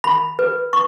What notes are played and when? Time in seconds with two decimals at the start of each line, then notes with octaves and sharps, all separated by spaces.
0.04 B5
0.39 B4
0.73 C#6